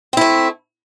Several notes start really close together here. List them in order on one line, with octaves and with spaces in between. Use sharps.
C4 E4 A3